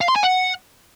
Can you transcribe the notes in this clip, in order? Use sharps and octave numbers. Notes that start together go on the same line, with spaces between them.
F5
C6
G#5
F#5